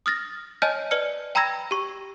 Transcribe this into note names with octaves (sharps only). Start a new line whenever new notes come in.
D#6 F6 A6 A#6
C#5 D#5 G#5 A5 F6 G6
B4 D5 F6 C#7
G5 A#5 B5 E6 G#6 A#6
G4 C#6